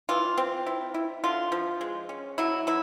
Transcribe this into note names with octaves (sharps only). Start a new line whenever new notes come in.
E3 F4
C4
E4
E4
D3 F4
F3
G#3
C#4
F#3 E4
F#3 E4